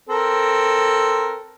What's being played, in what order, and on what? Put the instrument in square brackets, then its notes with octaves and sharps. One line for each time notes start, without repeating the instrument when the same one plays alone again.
[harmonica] C4 A4 A#4